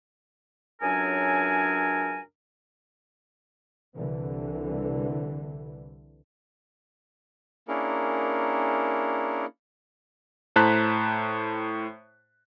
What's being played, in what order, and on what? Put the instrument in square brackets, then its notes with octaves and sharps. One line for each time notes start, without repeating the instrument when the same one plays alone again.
[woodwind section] C#2 F#2 F#3 D4 A#4 G#5
[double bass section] C2 D3 E3
[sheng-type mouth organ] A#3 C#4 D4 E4 G#4 A#4
[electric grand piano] A2 C5 A5 A#5 F#6 B6